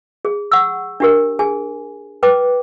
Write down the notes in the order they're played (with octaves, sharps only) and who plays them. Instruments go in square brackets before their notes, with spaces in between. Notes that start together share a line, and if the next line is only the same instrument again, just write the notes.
[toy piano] G#4
F#5 C#6 E6
D4 G4 A#4
G#4 G#5
B4 G5 D6